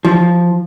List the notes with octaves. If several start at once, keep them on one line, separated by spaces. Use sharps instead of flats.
F3